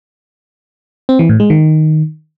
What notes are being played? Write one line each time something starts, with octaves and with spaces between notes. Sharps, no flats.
C4
E3
A2
G#3
D#3